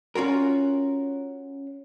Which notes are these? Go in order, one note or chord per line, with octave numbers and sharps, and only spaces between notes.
C#4 F4 F#4 A#4